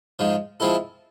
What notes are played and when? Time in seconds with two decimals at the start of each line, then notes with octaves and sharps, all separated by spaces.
0.19 G#2 F3 G#3
0.60 F3 G#3 C4 E4 A4